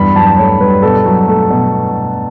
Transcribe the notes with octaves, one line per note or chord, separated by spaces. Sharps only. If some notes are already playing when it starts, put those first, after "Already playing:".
Already playing: E2 G2 B5
F#3 A5
A3 C#5
G2 B4
B2 A4
F#3
A3
B2